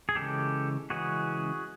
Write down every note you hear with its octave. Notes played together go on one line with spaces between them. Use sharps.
G#4
C#3 E3 G#3 C#4 G4 A4
C#3 E3 G#3 C#4 F#4 G#4